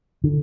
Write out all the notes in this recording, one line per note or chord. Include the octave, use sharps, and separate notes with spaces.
D3